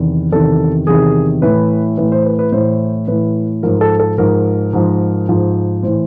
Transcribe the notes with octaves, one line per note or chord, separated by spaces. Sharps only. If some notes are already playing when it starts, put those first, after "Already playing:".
Already playing: E2 C3 D#3
E2 C3 D#3 A4
E2 C3 D#3 G#4
A2 E3 B4
A2 E3 B4
C5
B4
B4
A2 E3 C5
A2 E3 B4
G#2 F3 A#4
A4
A4
G#2 F3 A#4
G#2 F3
G#2 F3
A2 E3 C5